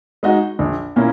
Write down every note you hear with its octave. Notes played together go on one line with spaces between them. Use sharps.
G#3 D#4 F#4
A#1
A#2 A#3 C#4 E4